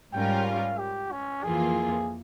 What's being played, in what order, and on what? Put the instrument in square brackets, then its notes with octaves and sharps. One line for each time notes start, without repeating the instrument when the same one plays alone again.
[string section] G#2 G3 C#4 F4 A#4 [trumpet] G5
[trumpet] F5
G4
C#4
[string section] F2 E3 A#3 F4 [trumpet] G#4